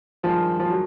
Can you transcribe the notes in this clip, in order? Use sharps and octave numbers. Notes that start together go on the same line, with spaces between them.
G2 D#3 F3 G#3
F3
F#3